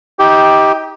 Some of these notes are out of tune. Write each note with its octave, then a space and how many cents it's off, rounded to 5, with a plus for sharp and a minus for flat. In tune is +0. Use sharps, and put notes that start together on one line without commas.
D#4 +25 G4 +0